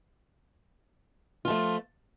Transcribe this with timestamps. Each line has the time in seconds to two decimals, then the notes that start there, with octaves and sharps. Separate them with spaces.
1.45 F4
1.48 F3
1.50 A3